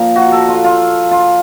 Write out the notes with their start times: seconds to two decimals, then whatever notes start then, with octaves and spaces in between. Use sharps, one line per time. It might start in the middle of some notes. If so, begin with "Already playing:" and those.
Already playing: A#2 F3 A#4
0.16 F#4
0.32 A4
0.49 F4
0.64 F4
1.11 F4